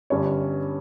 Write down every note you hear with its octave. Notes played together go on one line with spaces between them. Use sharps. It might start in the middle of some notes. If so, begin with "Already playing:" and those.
G1 G2 G3 C#4 C#5